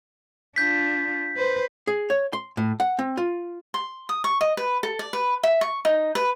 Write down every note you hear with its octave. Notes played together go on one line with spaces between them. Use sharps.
D4 F4 G6 B6
B4 C5
G#4
C#5
C6
A2
F#5
C4
F4
C6
D#6
C#6
D#5
B4
A4
D5
B4
E5
C#6
D#4
B4